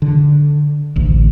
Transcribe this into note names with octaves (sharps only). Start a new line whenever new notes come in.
D3
A1 D2